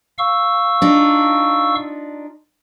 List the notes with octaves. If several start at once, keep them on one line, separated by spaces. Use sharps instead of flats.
F5 C#6 E6
D4 D#4 F4